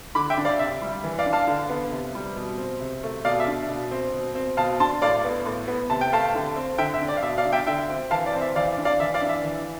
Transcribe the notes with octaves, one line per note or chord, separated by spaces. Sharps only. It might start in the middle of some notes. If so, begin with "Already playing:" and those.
D3 B5 D6
E5 G5
D4
D5 F5
C3 E5
G3
E3
D5 F5
D4
F5 A5
D3
B3
C3
G3
B2
C4
C3
A3
B2 D5 F5
E5
D4
B2
C4
B2
C4
B2 F5 A5
D4 A5 C6
A2 D5 F5
B3
A2
B3
C3 A5
G5
A3 F5 A5
D3
C4
D3 E5 G5
E5
D4
D5
F5
B2 E5
D5 F5
D4
E5 G5
D3 E5 G5
C4
E3 F5 A5
D5
C4
E5
E3 D5 F5
D4
D5 F5
E3 E5
D5 F5
D4
E5
E3